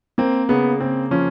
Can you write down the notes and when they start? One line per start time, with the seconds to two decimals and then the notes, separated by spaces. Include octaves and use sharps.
0.18 A#3 C4
0.49 C#3 B3
0.80 C#3 C4
1.11 F3 C#4